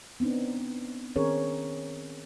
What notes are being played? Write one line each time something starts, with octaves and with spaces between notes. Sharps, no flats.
B3 C4 D4 D#4
D#3 C4 C#4 G#4 A#4 C#5